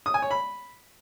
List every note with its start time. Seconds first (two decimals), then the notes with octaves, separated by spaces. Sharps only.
0.06 D#6
0.14 G#5
0.22 C#5
0.31 B5